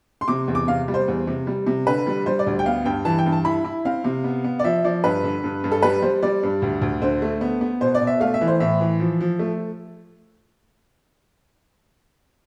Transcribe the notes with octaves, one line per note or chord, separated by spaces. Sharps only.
C6
C3 D6
E2
D6
C3 F5
G3
C5
E2
C3
G3
C3
D3 B4
G3
G3 C5
D5
D2
G5
B3 F5
G2 G5
E3 A5
G5
G2
A5
E4 B5
E4
C4 F5
C3
B3
B3
D5
F3 E5
F3 D5
G2 B4
D3
G2
G2
A4
G3 B4
G3 C5
G3 D5
G2
D2
D2
D3 C5
A3
B3
B3
B2 C5
D5
B2
E5
A3 F5
E5
E3
C5
A2 E5
E3
F3
F3
A3